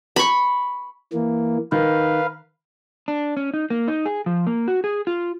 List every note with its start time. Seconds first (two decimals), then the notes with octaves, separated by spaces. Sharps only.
0.16 B5 C#6
1.13 E3 A#3
1.72 D#3 B4 F5
3.08 D4
3.37 C#4
3.54 D#4
3.70 A#3
3.88 D#4
4.06 G#4
4.26 F3
4.47 A#3
4.68 F#4
4.84 G#4
5.07 F4